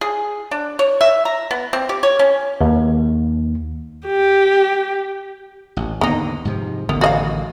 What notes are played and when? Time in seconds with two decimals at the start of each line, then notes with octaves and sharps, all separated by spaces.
0.01 G#4
0.51 D4
0.79 C#5
1.01 E5
1.25 A#5
1.51 B3
1.73 C4
1.89 G4
2.03 C#5
2.19 C#4
2.61 D#2
4.06 G4
5.77 A1
6.01 D#2 G#2 D3 B3 D#4
6.45 G#2 C3 F3
6.89 A1 D3 D#3 B3
7.01 F#4 D#5 F5